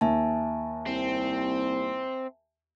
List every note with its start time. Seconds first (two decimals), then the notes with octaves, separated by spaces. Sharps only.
0.01 D#2 E5 G#5 A5
0.87 C2 C4